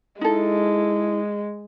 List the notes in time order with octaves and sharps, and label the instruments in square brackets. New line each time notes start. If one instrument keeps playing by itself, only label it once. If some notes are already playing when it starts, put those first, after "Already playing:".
[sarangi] G#3 [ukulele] D#4 A4 [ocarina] E4